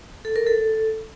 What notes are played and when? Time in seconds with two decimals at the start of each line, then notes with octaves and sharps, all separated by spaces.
0.25 A4
0.36 A#4
0.47 A4